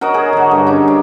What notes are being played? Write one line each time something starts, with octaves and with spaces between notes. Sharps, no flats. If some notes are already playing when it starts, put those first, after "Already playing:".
F#4 A#4 C#5 D#5
G#4
D3 F#4
G2
C#4 D#4
D4